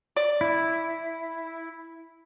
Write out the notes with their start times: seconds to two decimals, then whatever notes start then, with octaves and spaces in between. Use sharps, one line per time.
0.16 D5
0.41 E4